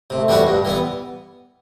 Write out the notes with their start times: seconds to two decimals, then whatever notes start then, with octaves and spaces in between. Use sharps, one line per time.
0.10 C3 A3
0.28 E3 G3 D4 F#4
0.46 G2 G3
0.65 E3 B3